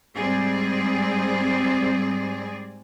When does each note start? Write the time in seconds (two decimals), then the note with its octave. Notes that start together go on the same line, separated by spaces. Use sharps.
0.15 G#2 G3 C4 G#4 D5